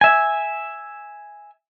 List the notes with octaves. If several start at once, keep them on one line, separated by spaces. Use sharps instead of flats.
E5 G#5